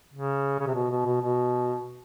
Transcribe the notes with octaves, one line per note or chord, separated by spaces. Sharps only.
C#3
C#3
C3
B2
B2
B2
B2